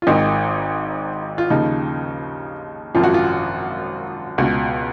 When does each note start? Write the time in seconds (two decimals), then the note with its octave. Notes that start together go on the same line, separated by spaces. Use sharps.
0.02 F4
0.07 G#1 G#2 D#3 D#4
1.38 F4
1.50 D#2 C#3 F3 D#4
2.95 G#1 F#2 F3 F4
3.03 F#4
3.14 F4
4.38 C#2 B2 F#4